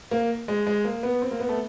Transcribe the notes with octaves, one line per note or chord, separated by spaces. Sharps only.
A#3
G#3
G#3
A#3
B3
C4
A#3
B3
A3